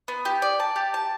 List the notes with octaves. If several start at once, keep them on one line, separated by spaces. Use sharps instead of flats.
B3
G4
D5
A5
G4
A5